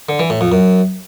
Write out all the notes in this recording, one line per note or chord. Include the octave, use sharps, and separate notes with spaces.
D3
E3
A2
F2
F#2